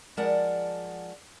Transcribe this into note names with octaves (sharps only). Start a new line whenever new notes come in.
F3 G#3 A#4 D5 F#5 A5